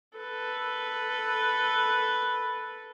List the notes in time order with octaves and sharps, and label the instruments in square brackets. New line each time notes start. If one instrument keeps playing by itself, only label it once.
[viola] A4 B4